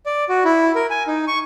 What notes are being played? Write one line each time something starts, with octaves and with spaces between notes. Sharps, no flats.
D5
F#4
E4
A#4
G#5
D#4
C#6